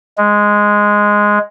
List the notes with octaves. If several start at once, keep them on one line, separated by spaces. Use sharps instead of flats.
G#3